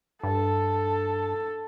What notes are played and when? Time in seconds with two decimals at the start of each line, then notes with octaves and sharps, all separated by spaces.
0.23 G2 A4